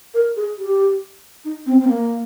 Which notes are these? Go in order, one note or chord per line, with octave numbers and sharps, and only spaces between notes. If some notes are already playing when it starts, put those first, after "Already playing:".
A#4
G#4
G4
D#4
C4
C4
A#3